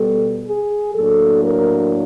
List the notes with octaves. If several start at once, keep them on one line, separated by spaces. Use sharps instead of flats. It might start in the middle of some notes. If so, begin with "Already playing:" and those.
Already playing: B2 G3 B3 A4
G#4
A2 F#3 A#3 D4 A4
A#4